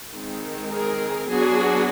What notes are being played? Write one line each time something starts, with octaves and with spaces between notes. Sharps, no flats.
D#3 G#3 C4
G#4 A#4
F#3 B3 D4 F#4 G#4